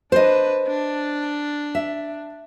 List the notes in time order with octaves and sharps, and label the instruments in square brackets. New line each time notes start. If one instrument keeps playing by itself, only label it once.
[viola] D4 B4 [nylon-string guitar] C5 D#5
[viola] D4
[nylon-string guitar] E5